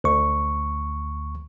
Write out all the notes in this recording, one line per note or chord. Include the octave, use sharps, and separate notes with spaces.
D2 C#6